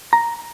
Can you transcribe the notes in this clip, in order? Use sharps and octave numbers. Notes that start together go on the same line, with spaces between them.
A#5